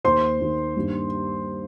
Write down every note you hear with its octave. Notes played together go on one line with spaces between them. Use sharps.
D#2 D#3 A#3 C5 C6
D#2 D#3 A#3
G2 D#3 G3 A#3